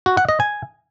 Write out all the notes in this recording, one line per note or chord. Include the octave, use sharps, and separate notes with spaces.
F#4
F#5
D#5
G#5